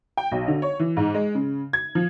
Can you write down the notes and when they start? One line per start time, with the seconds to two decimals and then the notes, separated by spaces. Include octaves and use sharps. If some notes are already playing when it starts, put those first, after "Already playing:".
0.17 G5
0.32 B1
0.48 D3
0.62 C#5
0.79 E3
0.97 G#2
1.14 G#3
1.35 C#3
1.73 G#6
1.95 F3